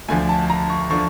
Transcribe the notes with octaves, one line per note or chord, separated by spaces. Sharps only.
D2 D3 F3 G#5
A5
A#5
C#6
D3 F3 C#6